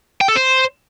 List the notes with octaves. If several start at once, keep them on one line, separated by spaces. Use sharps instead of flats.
G5
A4
C5